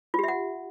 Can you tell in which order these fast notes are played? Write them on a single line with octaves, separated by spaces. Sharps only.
F4 G4 E5 F#5